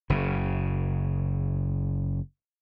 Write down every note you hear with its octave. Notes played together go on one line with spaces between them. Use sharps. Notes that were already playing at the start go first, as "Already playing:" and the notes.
F#1 C#3